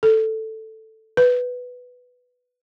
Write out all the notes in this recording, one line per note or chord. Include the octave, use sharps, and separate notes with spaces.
A4
B4